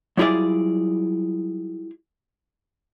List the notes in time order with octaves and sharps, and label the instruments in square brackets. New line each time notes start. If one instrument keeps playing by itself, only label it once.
[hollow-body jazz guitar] F#3 G3 E4 F4 G#4 D5